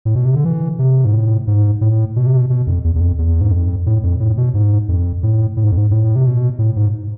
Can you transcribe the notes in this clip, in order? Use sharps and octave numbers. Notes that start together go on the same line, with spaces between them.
A2
B2
C3
D3
E3
C3
G#2
A2
G#2
A2
B2
C3
B2
B2
F2
E2
E2
F2
E2
G#2
F2
A2
F2
A2
B2
G#2
F2
A2
A2
G#2
F2
G#2
A2
C3
B2
A2
G#2